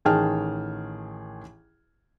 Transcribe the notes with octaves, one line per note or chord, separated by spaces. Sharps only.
A1 D#3 G#4 G5 A5 F6